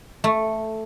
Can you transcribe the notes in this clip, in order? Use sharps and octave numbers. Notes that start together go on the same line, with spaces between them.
A3